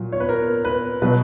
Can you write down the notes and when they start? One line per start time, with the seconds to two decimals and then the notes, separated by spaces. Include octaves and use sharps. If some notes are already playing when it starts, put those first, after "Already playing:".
Already playing: A#2 F#3
0.12 C#5
0.20 B4
0.29 A#4
0.65 B4
1.02 B2 F#3 B4